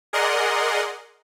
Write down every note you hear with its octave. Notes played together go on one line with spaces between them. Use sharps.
G#4 A#4 D5 D#5 F#5 C6